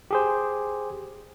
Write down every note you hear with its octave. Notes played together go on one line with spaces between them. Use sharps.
G4 G#4 C5